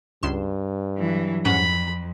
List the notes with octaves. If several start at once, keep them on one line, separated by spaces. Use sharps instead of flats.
C#2 G2 C6 E7
E3 F#3
F2 G#2 C#4 F#5 B5